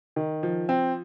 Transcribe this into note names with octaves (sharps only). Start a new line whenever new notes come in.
D#3
F3
C4